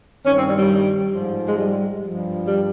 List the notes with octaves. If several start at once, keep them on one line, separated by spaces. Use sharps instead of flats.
G2 D#3 C#4
C4
G3
G3
G#2 F3
G#3
G3
G2 F3
G3